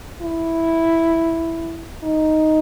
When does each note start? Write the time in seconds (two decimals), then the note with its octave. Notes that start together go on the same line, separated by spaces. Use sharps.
0.21 E4
2.03 D#4